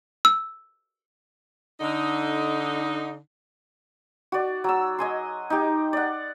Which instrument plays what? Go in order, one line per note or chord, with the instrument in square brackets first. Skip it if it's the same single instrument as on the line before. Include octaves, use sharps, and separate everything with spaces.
[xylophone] E6
[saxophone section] D3 D#4
[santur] F#4 D5
F#3 E6
D#5 G#5 C6
D#4 G4
D5 F#5